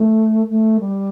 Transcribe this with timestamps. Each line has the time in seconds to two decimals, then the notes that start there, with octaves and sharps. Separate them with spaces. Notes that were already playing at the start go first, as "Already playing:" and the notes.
Already playing: A3
0.49 A3
0.79 G3